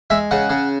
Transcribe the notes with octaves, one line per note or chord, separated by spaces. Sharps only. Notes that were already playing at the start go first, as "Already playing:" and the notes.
G#3 E5
C#3 F#5
C#3